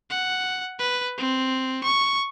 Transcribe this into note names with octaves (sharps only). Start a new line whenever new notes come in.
F#5
B4
C4
C#6